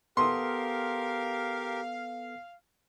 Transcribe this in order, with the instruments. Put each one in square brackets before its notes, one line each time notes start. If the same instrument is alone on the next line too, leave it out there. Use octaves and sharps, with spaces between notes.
[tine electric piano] B3 A4 D#6 [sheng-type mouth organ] G4 A#4 [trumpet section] F5 [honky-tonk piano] C6